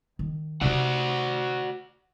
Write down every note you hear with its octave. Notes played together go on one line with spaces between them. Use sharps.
D#3
C3 D#4 F#4 D5 F#5